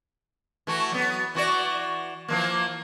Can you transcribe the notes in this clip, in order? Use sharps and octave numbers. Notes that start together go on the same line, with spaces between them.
E3 A3 F#4
F#3 B3
E3 F#4 D5
E3 F3 A#3